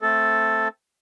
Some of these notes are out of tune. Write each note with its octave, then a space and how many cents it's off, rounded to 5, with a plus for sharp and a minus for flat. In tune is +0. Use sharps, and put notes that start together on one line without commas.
A3 +0 C4 +0 A4 +0